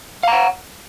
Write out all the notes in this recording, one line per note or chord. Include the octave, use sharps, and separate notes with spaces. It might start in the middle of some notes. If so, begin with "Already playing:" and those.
F5 F#5 A#5